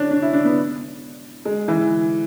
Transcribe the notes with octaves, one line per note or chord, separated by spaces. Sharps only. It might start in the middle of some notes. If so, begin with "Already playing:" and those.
Already playing: C#4 D4
D4
E4
D4
B3
G#3
E3